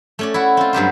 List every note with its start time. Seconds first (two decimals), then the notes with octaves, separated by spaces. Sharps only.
0.19 A3 C#4 D5
0.34 E4 F#4
0.57 C4 F4
0.73 G2 F#3 G4 C5